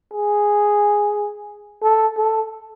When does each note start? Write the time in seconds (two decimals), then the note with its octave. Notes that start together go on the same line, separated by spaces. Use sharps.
0.13 G#4
1.83 A4
2.17 A4